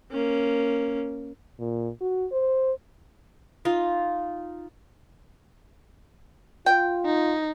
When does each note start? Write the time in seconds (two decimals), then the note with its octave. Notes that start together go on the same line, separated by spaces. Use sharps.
0.11 A#3 C#4
1.59 A#2
2.01 F#4
2.32 C5
3.65 D#4 F4
6.66 F4 G5
7.05 D#4